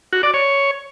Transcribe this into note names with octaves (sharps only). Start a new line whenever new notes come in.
F#4
D5
C#5